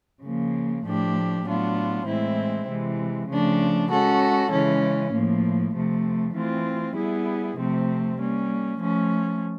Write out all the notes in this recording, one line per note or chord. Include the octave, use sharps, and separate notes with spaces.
C#3 F3 A#3
A2 F3 A3 D4 G4
A2 F#3 B3 D4 F4
A2 E3 G#3 C4 E4
C3 E3 G#3
C#3 F3 A3 D4
G#3 C#4 F#4 A4
C#3 E3 G#3 C#4
A2 F3 A#3
C3 F3 A3
E3 A3 C4 F4
G3 B3 E4 G#4
C3 F3 A3 C4
G3 A#3 C#4
F3 A3 C#4